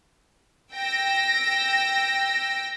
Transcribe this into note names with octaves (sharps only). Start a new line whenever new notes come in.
G5 E6 A#6